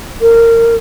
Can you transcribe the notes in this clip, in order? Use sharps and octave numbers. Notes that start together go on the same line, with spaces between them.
A#4